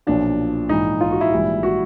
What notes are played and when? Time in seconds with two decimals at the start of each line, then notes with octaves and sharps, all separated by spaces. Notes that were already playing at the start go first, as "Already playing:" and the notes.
0.07 B1 A#2 F3 D4
0.69 A#1 G#2 E3 D#4
1.01 F4
1.11 F#4
1.21 E4
1.31 A#1 G#2 E3 G3
1.63 F#4